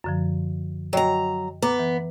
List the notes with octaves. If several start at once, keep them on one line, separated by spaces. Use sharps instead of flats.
F#2 D3 F3
F#3 D#5 G5 A#5
B3 A#5 D6
E3